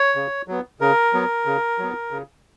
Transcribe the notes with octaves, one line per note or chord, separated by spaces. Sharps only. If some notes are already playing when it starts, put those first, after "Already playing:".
Already playing: C#5
C#3
F#3 B3
C#3 A#4
F#3 B3
C#3
F#3 B3
C#3